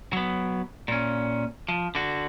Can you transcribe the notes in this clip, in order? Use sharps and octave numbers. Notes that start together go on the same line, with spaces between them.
F#3 B3
A#2 C#4
F3
D3 F#4